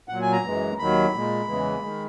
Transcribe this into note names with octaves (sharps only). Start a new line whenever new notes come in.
A#2 F#3 F#5
G#5
A#5
F#2 E3 G#3
D#2 D#3 F#3 B5
A#2 G#3
E2 C#3 E3 G#3
D#3 G#3